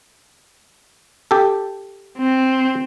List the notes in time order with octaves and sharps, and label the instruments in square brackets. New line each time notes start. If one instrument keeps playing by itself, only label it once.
[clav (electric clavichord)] G4 A4
[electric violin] C4